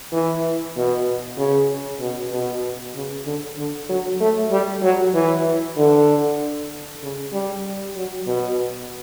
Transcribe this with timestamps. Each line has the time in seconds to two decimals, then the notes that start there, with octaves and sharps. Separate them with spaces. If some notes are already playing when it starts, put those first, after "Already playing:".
0.13 E3
0.76 B2
1.38 C#3
2.00 B2
2.32 B2
2.95 C#3
3.25 D3
3.58 D3
3.89 F#3
4.21 A3
4.51 G3
4.82 F#3
5.14 E3
5.77 D3
7.02 C#3
7.33 G3
7.96 F#3
8.27 B2